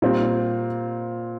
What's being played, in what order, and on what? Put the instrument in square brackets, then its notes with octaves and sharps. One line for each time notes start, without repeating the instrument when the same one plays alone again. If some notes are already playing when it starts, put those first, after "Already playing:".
[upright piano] A#2 G3 C4